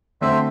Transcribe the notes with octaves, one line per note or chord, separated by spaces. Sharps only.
D3 A3 C4 F#4 C5 E5